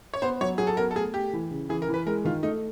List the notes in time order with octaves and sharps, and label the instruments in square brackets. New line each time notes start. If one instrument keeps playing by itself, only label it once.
[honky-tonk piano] C#5
[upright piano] B3 [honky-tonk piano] C5
[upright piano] F#3 [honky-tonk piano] C#5
[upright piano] F#3 [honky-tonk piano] G#4
[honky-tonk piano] A4
[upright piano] B3 [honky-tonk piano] A#4
[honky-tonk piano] A4
[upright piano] A3 [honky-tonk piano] G#4
[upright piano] A3 [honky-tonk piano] G4
[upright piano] E3
C#3
[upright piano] E3 [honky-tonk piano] G#4
[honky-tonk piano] A#4
[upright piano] E3
[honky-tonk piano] B4
[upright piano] G#3 [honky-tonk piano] A#4
[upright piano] D#3 [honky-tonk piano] F4
[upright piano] A3 [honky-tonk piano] D#4